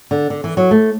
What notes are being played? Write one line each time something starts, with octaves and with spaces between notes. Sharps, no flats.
D3
D3
E3
F#3
A3